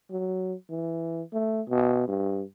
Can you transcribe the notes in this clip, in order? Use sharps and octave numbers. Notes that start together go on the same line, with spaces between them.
F#3
E3
A3
B2
G2